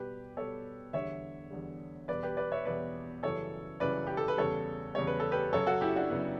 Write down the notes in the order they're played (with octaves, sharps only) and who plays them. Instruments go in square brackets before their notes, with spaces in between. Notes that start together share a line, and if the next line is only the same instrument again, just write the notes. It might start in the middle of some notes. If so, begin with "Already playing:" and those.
Already playing: [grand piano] B2 G3 G4 B4
B2 G3 A4 C#5
E2 D3 G3 C#5 E5
E2 D3 G3
E2 B2 G3 B4 D5
G4 B4
B4 D5
C#5 E5
E2 B2 G3 B4 D5
F#2 C#3 E3 G3 A4 C#5
F#2 C#3 E3 G3 B4 D5
G4
A4
B4
E2 C#3 G3 A4 C#5
E2 C#3 G3 C#5
B4
A4
G4 B4
F#2 C#3 F#3 A4 C#5
F#4 A4
E4 G4
D4 F#4
F#2 C#3 F#3 B3